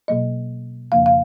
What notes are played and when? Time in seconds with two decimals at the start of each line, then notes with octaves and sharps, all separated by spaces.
0.08 B2 F#3 A#3 D#5
0.92 F2 C#3 F3 A#3 F5
1.06 F5